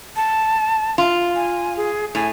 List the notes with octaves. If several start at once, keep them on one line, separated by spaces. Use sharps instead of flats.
A5
F4
G#5
G#4
A2 G#5